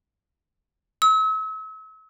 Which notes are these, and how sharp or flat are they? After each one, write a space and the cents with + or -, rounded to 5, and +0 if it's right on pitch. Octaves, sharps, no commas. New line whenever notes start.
E6 -40